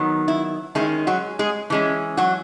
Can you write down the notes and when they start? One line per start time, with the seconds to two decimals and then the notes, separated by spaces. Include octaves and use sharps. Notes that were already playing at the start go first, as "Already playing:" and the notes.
Already playing: D#3 F#3 B3
0.28 E4
0.75 D#3 G#3 C#4 E4
1.07 F#3 F#4
1.39 G#3 G#4
1.70 E3 G#3 C#4
2.17 F#3 F#4